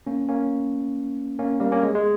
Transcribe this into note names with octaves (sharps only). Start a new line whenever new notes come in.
A#3 C#4
A#3 C#4
A#3 C#4
G3 A#3
A#3 C#4
G#3
G#3